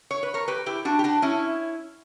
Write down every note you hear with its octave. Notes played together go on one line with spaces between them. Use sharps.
C#5
B4
A#4 C#5
G4 B4
E4 G4
D4 F#4
G4
D4 F#4
C#4 E4